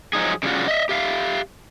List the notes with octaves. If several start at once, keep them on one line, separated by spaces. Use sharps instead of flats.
F3 F#3 D#4 G#4
C#3 G3 A#3 F4 F#4
D#5 E5
G4 E5 F5